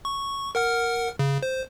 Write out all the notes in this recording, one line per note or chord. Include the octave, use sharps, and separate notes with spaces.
C#6
A#4 F#5 F6
C#3
C5